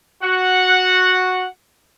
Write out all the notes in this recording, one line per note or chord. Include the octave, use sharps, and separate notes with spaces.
F#4 F#5